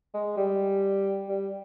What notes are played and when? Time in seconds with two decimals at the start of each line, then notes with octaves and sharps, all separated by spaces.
0.14 G#3
0.37 G3
1.29 G3